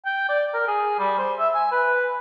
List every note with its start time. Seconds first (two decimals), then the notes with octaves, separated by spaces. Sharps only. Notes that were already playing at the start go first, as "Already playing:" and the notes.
0.06 G5
0.29 D5
0.54 A#4
0.68 G#4
0.99 G3
1.19 C5
1.39 E5
1.55 G#5
1.72 B4